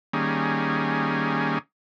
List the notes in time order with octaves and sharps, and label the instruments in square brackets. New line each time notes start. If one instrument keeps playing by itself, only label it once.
[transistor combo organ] D#3 G3 A#3 C#4 G#4